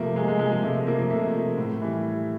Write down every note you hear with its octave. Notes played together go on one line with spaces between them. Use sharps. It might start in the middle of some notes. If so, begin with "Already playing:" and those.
Already playing: C3 F3 A3 A#3
C3 G#3
G#3
F3 G#3
G#3
C3 A3
F3 A#3
C3 A3
F3
A2
E3 G3